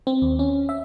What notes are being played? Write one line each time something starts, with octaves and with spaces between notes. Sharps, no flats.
C4
D#2
C#4
E5